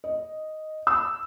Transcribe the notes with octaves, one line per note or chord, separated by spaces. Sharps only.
D#5
E6